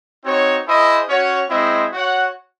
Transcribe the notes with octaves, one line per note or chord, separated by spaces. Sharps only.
C4 D#4 F#4 C#5
E4 G#4 C5 D#5
C#4 F#4 C#5
G#3 C4 E4 C5 D#5
F#4 C#5 F#5